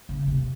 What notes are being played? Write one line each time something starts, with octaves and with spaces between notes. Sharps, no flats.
C#3
C3